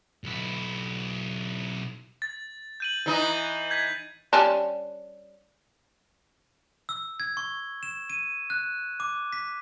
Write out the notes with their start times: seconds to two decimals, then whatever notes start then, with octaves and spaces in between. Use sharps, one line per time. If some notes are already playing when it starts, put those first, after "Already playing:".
0.24 B1 E4
2.22 A6
2.80 G6 D#7 F#7
3.06 E3 D#4
3.71 G6 G#6 B6
4.33 G3 C#4 D4
6.89 E6
7.20 G#6
7.37 C#6
7.83 E7
8.10 D#7
8.50 F#6
9.00 D6
9.33 B6